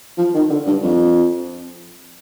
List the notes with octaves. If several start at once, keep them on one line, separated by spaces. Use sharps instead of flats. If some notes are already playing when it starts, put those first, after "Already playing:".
F3
D#3
D3
G2
F2